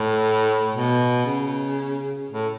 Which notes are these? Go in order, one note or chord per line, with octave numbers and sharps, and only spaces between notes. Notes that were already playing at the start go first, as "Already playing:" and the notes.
Already playing: A2
B2
C#3
A2